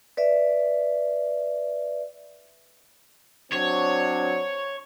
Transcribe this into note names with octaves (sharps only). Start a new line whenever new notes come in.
B4 D5 E5
F#3 C4 D4 C#5